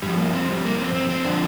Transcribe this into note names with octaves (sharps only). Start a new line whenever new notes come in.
G2 F3 G3
A#3
C4
G3
A#3
C4
C4
C4
D3 F3 D4